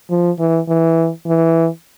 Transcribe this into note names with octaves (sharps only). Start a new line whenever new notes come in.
F3
E3
E3
E3